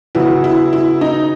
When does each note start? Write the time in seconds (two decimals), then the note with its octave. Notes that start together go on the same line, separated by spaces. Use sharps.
0.15 C#3 F#3 B3 E4
0.44 E4
0.73 E4
1.01 D#4